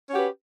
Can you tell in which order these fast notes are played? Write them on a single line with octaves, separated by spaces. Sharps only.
C#4 F#4 G4 B4